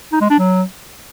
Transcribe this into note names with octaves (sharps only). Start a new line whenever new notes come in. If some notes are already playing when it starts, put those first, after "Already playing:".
D#4
G#3
D4
F#3